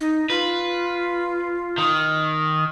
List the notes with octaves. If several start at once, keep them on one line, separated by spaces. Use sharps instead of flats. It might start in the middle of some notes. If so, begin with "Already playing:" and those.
D#4
F4 B4
D#3